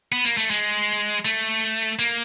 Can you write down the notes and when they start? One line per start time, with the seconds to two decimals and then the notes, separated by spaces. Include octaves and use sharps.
0.12 B3
0.25 A#3
0.37 A3
0.50 G#3
1.25 A3
1.99 A#3